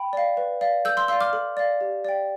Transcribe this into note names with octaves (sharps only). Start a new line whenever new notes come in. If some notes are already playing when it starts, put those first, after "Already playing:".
Already playing: G5 B5
D5 F5
B4
D5 F5
A4 E6 G6
C6 E6
D5 F5 C6 E6
D6 F6
A4
D5 F5
G4
D5 G5